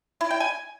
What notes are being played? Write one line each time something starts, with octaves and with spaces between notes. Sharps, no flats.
E4
G5
G#5